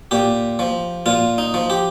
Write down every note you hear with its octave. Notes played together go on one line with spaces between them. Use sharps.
A#2 G4
F3
A#2 F4
D#4
F3
G4